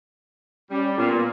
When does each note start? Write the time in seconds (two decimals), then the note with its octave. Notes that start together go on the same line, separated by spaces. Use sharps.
0.71 G3 C#4
0.98 A#2 B3